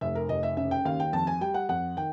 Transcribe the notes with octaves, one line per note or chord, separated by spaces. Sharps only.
F1 E5
A#4
F1 D#5
E5
C#3 E5
G5
D#2 F5
G5
F2 A5
G#5
G3 G5
F#5
F2 F#5
D#3 G5